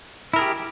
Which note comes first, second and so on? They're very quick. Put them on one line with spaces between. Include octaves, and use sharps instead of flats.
E4 A#4 G#4 G4